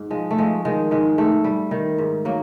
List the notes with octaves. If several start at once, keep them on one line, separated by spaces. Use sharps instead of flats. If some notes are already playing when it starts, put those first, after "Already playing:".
Already playing: G#2
F3 G#3
A3
F3 G#3
D#3 G#3
G#2 G#3
G#2 A3
G3
D#3
G#2
F#3 A#3